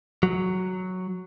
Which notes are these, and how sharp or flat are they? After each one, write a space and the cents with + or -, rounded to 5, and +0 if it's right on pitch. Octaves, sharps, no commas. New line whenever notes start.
F#3 +0